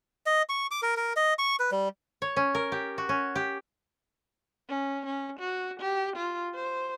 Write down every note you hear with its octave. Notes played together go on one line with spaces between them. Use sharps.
D#5
C#6
D6
A#4
A#4
D#5
C#6
B4
G3
C#5
C#4
A#4
G4
F#4
C#4
G4
C#4
C#4
F#4
G4
F4
C5